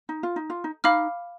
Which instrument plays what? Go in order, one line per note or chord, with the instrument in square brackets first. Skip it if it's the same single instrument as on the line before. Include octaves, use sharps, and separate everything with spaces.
[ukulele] D#4
F4
D#4
F4
D#4
[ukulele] D#4 [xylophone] F5 B5 D6 F6